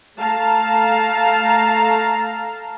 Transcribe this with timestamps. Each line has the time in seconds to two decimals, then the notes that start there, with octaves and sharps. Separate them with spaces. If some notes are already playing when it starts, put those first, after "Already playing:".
0.17 A3 F5 A5 A#5